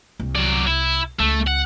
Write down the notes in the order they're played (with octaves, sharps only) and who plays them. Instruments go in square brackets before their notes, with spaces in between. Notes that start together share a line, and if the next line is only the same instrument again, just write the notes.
[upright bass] C2
[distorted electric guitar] F#3 D5
E4
[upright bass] C#2 [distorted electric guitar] A3
[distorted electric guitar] F#5